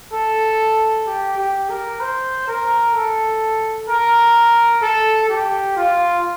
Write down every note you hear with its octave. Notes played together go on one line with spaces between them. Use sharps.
A4
G4
G4
A#4
C5
A#4
A4
A#4
A4
G4
F4